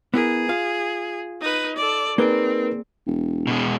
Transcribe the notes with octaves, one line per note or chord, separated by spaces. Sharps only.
B3 E4 G#4 A#4
F4 F5
D#4 B4
A4 D5
A#3 C4 D#4 G#4 A#4 B4 D5
E1
B2 G#3